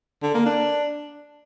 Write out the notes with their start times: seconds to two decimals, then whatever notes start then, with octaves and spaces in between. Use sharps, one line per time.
0.23 D3
0.34 A#3
0.46 D4